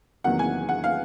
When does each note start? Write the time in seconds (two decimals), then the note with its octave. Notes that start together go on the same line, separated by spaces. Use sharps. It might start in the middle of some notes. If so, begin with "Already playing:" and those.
0.24 E2 C3 D#3 F#3 A#3 F#5
0.39 G#5
0.69 F#5
0.84 F5